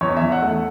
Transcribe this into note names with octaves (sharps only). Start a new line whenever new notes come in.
E2 C#5
E5
E2
F#5
A3